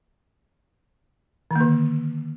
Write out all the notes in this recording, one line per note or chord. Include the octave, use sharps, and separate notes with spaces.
D3 D#3 A#3